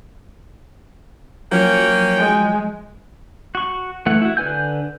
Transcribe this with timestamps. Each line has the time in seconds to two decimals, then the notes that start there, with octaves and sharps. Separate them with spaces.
1.52 F3 F#3 A#3 C#4 G5
2.17 G#3
3.55 F#4 C#6
4.06 E3 A3 F#5
4.22 E4 F#4
4.37 D3 B4 G#5 G6